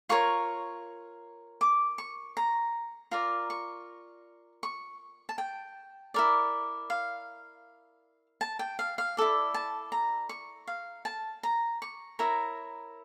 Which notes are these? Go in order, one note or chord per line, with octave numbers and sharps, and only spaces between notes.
F4 A#4 C#5 C#6
D6
C#6
A#5
F4 A#4 D5 A#5
C#6
C#6
A5
G5
E4 A#4 D5
F5
A5
G5
F5
F5
E4 A4 D5
A5
A#5
C#6
F5
A5
A#5
C#6
E4 A#4 C#5 A#5